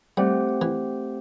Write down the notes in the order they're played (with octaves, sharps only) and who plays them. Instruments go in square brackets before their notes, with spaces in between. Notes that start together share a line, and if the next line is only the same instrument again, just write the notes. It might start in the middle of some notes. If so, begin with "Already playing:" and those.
[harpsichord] G3 [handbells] A3 C4 G4 C5 F#5
[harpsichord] E3